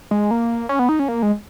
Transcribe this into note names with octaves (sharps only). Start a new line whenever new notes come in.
G#3
A#3
C#4
B3
D#4
C#4
A#3
G#3